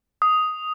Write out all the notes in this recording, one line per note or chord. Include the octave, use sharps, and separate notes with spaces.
D#6